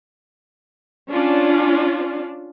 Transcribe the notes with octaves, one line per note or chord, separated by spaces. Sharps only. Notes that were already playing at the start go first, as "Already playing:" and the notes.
C#4 D4 F4